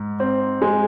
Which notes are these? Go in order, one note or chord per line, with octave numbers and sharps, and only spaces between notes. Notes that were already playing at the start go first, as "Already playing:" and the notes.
Already playing: G#2
C4
G#3